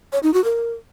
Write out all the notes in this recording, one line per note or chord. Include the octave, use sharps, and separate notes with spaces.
C#5
D#4
F#4
A#4